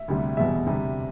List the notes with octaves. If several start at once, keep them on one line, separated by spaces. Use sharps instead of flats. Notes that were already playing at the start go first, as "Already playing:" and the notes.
Already playing: E5
D2 C3 G3
E2 B2 G3 E5
D2 C3 G3